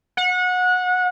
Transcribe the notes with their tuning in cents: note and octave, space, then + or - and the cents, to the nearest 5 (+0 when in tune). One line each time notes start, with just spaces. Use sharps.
F#5 -25